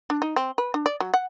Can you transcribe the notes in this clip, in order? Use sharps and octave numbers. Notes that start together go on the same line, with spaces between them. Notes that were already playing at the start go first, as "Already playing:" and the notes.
D4
D#4
C4
B4
D4
D5
F#3
F#5